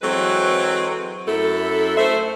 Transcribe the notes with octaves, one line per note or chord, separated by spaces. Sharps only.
E3 F#3 G#3 C4 A4 B4
F#2 E4 A4
A3 C5 E5